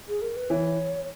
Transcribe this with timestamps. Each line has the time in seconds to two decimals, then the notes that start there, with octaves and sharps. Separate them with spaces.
0.09 G#4
0.22 A#4
0.36 B4
0.50 E3 C#5